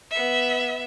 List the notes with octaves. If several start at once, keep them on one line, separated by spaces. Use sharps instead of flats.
B3 E5